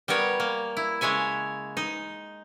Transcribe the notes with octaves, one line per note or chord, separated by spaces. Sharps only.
G3 B3 A#4 C#5
A#3
E4
C#3 G#3 C#5 E5 G#5
D#4